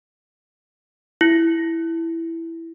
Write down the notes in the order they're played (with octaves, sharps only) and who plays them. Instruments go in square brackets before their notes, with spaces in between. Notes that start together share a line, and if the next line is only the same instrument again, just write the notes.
[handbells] E4